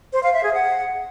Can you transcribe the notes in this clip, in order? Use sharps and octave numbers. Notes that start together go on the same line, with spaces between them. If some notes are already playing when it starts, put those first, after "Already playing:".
C5
F5
E5
G#4
F#5